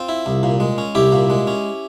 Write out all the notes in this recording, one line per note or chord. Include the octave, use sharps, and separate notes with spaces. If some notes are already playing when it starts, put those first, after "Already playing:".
Already playing: C4 F4
E4
C2
A#2
G#3
C#4
C2 E4 G4
A#2
G#3
C#4